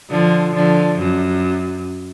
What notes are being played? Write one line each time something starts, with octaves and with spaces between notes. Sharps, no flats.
D3 F3
D3 F3
F#2